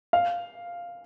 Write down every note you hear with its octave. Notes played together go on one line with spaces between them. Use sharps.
F5